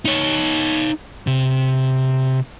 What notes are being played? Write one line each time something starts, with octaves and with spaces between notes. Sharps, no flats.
D#4 C#5
C3